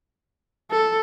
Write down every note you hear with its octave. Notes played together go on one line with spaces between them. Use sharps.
A4